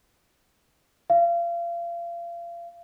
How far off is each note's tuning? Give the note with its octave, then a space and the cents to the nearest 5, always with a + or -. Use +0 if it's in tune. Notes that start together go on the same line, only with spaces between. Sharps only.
F5 -30